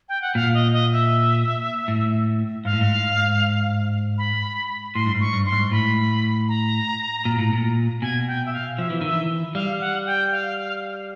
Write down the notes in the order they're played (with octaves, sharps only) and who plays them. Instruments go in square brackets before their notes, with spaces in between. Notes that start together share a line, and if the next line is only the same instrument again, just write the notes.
[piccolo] G5
F#5
[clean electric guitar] A#2 [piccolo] F5
[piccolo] D#5
D#5
E5
[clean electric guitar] A2
[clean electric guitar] G#2 [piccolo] F5
[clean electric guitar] A2
G#2
[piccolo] B5
[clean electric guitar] A2 [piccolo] C6
[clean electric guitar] G2
G#2
[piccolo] C#6
[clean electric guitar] G2
[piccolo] C6
[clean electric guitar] G#2
[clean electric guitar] A2 [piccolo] B5
[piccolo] A#5
[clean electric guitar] A#2
A2
A#2
[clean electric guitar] B2 [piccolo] G#5
[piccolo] G5
E5
F5
[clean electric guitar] F3 [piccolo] E5
[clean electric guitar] E3
[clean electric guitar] D#3 [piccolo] E5
[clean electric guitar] E3
[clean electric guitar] G3 [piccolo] F5
[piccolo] F#5
G5
F5